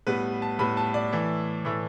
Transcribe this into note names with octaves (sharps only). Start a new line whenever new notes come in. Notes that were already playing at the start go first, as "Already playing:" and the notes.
A2 G3 B3 B4
A5
A2 G3 B3 B5
A5
D5
A2 E3 A3
A2 E3 A3